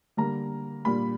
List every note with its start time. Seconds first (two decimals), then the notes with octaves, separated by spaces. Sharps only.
0.17 D3 G3 A#3 A#5
0.85 A#2 G3 A#3 B5